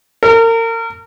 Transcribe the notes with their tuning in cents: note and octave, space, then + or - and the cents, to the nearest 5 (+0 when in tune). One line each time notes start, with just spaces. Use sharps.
A#4 -35